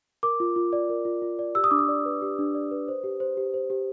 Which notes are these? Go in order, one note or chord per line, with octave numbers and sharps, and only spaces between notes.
A#4 D6
F4
F4
D5
A#4
F4
F4
D5
G4 E6
D#6
D4 D6
D#6
D5
B4
G4
D4
D5
B4
C5
G4
C5
G4
C5
G4